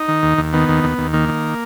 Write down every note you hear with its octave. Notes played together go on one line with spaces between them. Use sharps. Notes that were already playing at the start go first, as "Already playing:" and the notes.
Already playing: D#4
D#3
D#2
D#2
D#3 B3
D#2
D#2
D#2
D#3 A#3
D#3